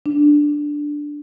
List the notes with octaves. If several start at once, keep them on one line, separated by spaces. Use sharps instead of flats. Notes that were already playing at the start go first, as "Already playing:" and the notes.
D4